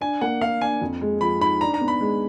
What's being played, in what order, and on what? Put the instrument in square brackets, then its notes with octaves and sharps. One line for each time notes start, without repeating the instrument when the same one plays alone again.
[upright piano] D4 [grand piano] G#5
[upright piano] A#3 [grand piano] F#5
[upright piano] A#3 [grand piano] F5
[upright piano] D4 [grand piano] G#5
[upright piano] F2
G#3
[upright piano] F3 [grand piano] B5
[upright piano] D#4 [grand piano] B5
[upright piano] D4 [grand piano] A#5
[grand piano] A#5
[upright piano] B3
[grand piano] B5
[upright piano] G#3